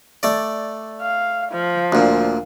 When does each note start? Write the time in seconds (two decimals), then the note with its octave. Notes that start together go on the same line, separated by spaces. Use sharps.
0.23 A3 D5
1.01 F5
1.51 F3
1.92 D2 A#2